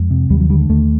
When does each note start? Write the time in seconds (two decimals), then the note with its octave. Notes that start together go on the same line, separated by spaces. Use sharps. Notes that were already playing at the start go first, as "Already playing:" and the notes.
Already playing: F2 G#3
0.10 C3
0.30 D#2 G3
0.40 F#3
0.50 D3 G3
0.60 G#3
0.69 D#2 A3